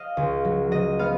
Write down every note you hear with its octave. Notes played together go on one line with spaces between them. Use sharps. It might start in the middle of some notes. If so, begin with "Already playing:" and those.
Already playing: D#5 F5
C#2
F#3
F#3 D#5
B3 F5